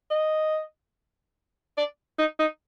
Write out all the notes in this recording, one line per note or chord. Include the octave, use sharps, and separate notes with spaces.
D#5
D5
D#4
D#4